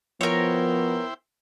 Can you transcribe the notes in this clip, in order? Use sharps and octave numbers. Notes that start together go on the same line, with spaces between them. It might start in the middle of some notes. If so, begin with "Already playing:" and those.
F3 B3 E4 A#4 C5 C#5 G5